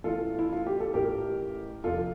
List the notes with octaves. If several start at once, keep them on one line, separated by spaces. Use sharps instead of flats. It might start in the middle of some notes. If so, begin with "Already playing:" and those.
A1 A2 E3 F4 A4
E4
F4
G4
A4
A1 A2 E3 G4 A#4
F1 F2 D3 F4 A4